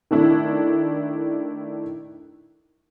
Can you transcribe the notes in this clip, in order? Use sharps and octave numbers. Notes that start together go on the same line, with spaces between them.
D#3 A3 D4 E4